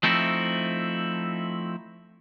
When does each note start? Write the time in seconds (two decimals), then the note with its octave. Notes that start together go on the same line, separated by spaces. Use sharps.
0.03 F3 A3 C4 D#4 E4